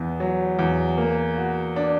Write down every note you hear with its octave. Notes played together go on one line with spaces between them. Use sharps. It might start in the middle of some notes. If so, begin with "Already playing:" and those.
Already playing: E2 B3
F#3
E2
A#3
F#4
D4